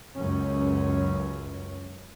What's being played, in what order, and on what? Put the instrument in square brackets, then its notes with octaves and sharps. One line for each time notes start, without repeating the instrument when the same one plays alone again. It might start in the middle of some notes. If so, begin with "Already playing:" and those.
[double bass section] C#2 F#2 C#4